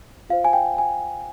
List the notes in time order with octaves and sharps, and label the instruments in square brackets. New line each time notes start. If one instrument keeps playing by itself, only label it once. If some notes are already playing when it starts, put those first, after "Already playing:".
[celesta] F4 C5 F5
G#5
G5
G#5